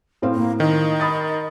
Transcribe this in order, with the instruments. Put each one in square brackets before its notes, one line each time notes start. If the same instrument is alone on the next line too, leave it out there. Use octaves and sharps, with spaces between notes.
[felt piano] A2 C4 F5
[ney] A#3
[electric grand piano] D#3 [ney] D#5
[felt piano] B5 D#6 A6